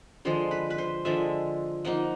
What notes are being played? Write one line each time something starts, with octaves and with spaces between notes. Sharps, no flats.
D3 F3 G#3 C5
B4
B4
C5
D3 F3 G#3 E5
F3 A#3 D#4 F#5